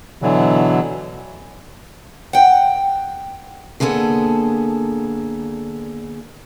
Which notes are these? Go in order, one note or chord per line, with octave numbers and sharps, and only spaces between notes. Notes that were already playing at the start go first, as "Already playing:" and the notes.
B2 D3 E3 F#3
F#5 G5
D3 A#3 B3 G#4 A4